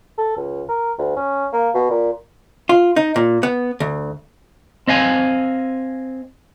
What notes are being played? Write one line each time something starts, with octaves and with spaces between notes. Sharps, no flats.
A4
C#2
A#4
D2
C#4
A#3
B2
A#2
F4
D#4
A#2
B3
D2
C4 D#5 F5 G#5